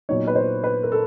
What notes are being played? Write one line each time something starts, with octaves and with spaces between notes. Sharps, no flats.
A#2 F#3 B3 D#4 C#5
B4
C5
B4
A#4
A4